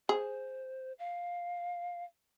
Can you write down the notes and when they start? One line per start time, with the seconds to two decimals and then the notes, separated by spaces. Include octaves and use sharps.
0.09 G#4 C5
0.99 F5